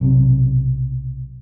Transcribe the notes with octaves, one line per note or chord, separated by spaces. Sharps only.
B1 C3